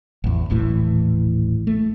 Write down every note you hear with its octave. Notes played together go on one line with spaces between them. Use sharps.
A1 E2
D#1 A1 A2 E3
A3